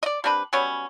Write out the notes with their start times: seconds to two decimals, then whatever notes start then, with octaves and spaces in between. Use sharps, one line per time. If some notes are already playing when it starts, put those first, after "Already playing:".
0.03 D5 D#5
0.24 G3 C4 D4 B4
0.53 F#3 G3 B3 C#4